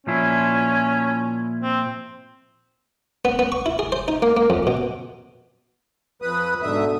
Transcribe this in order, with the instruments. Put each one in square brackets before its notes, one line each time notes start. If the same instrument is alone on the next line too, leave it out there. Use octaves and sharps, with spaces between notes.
[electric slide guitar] A#2 F3 E4 [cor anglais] C#4
[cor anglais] C4
[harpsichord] B3
B3
C#6
E4
G#4
C5
D#4
A#3
A#3
F2
B2
[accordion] F2 B4 D#6
[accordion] G#2 E5 D#6 [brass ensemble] B2 D3